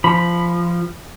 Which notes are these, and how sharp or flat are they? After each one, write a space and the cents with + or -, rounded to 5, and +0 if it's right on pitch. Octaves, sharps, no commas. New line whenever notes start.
F3 -15 B5 +0